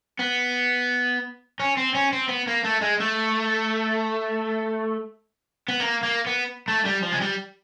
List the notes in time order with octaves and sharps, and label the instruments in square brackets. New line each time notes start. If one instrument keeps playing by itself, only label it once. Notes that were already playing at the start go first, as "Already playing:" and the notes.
[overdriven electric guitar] B3
C#4
C4
C#4
C4
B3
A#3
A3
G#3
A3
B3
A#3
A#3
B3
A3
G3
F3
G#3
G3